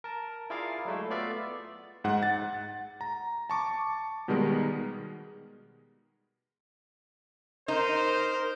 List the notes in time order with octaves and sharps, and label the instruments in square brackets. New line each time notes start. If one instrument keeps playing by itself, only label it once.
[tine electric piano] A#4 A5
E4 F4 G#4 A#4 D5 F5
F#3 G#3 A3 E4
A3 B3 F4 D5 E5 F5
[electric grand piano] G#2 F#5
F#5 A6
A#5
A5 C#6 D6
B2 D#3 G3 G#3 B3 A#4
[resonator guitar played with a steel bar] D#4 [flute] A#4 [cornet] C5